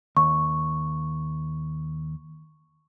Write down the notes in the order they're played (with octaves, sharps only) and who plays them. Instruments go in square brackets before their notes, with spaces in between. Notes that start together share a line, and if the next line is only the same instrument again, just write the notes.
[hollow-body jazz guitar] D#2 [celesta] C#6